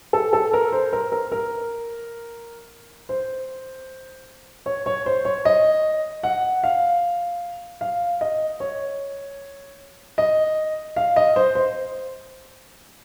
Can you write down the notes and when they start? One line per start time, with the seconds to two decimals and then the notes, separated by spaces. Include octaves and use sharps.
0.13 A4
0.33 A4
0.53 A#4
0.72 C5
0.93 A#4
1.12 A#4
1.32 A#4
3.09 C5
4.66 C#5
4.86 C#5
5.06 C5
5.25 C#5
5.45 D#5
6.23 F#5
6.64 F5
7.81 F5
8.21 D#5
8.60 C#5
10.18 D#5
10.96 F5
11.16 D#5
11.36 C5
11.55 C5